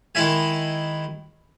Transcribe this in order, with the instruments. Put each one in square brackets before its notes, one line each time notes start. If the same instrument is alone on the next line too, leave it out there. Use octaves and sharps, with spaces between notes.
[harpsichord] D#3 G#3 E4 E5 G#5